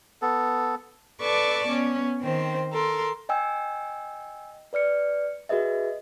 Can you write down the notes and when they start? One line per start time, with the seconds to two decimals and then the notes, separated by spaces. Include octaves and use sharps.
0.22 B3 A4
1.21 A4 B4 D5 A5 C#6 D6
1.67 B3 C#4
2.21 D#3 C4 C5
2.71 A4 A#4 C6
3.29 D#5 G5 G#5 E6
4.73 B4 D5 F6 C#7
5.49 F#4 G#4 B4 D#5 E5